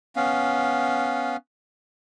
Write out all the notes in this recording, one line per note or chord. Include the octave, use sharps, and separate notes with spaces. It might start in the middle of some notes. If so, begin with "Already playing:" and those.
B3 C#4 F5